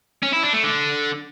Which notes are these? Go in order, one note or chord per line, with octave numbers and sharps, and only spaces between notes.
C#4
E4
D4
A3
D3